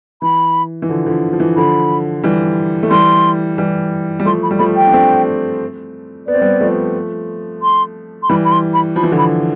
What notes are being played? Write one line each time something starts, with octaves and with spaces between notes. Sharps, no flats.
E3 B5
E3
D3 F3
D3 F3
F3
E3
D3 F3 B5
E3 G3
A3
E3 G3 C6
E3 G3
G3
F3 A3 C6
B5
G3
F3 A3 B5
G5
D4
A3 C4
B3 D5
C4
G3 B3
F3 A3
C6
C6
E3 G3 B5
B5
C6
B5
F3 B5
E3
D3 F3
B5